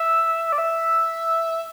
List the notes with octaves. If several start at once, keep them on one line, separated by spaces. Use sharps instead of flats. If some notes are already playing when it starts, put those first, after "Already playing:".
Already playing: E5
D5
E5